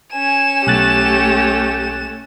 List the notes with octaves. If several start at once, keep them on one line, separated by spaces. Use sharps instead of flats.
C#4 G#5 E7
B1 A3 G4 F#6 A6